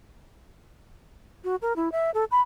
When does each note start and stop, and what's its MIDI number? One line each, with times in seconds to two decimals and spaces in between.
1.44 1.56 66
1.62 1.76 70
1.76 1.92 64
1.92 2.11 76
2.14 2.25 69
2.31 2.41 83